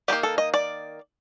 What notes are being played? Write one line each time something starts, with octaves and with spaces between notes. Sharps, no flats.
D#3 G3 A#3 G4
A4
D#5
D5